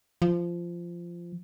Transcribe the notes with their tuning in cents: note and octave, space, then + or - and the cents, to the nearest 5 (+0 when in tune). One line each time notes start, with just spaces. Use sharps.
F3 -15